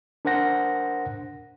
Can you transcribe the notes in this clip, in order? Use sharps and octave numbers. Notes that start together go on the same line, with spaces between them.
D4 A#4 C5 F#5 A#6